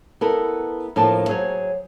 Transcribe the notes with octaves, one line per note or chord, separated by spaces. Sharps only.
B3 E4 A4 A#4
A2 F3 A3 A#3 D4 A5
F#3 G#4 C5 C#5